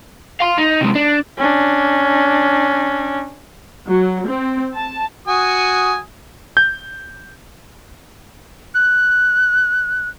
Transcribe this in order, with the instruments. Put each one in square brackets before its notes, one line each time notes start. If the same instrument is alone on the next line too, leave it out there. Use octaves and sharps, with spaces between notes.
[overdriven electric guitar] F5 C6
D#4
C3 G#3
D4
[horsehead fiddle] C#4 D4
[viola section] F#3
C4
A5
[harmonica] F#4 G#5 D#6
[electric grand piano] G6
[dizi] F#6